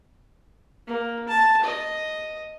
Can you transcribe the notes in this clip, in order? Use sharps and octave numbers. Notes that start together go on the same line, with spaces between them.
A#3
A5
D#5